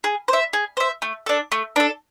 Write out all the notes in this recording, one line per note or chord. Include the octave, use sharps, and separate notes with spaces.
G#4
C5 E5
G#4
C5 E5
A3
D4 A4
A3
D4 A4